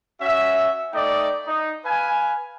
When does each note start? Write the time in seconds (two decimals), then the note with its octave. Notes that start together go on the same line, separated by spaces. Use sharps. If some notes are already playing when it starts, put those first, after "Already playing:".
0.22 C#4 F#4 E5
0.93 A3 D#4 D5 D#5 G5
1.47 D#4
1.85 B4 F5 G#5